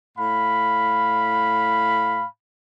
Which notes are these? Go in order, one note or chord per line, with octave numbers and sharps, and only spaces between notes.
A2 F5 B5